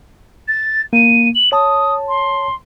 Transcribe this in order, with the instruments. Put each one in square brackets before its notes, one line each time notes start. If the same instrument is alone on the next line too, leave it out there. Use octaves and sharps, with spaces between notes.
[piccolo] A6
[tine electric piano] A#3 [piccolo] D#7
[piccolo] F#7
[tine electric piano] C#5 A5 [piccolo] D#6
[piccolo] C6